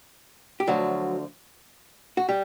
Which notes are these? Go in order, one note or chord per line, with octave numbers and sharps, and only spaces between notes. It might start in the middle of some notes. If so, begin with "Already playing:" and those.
G4
D2 D3 F3 F#3 F#4
F#4
G3 G4